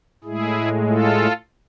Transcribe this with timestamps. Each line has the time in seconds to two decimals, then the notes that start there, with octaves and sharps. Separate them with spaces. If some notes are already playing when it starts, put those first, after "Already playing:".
0.24 A2 G#3 E4 G#4
0.88 F4 A4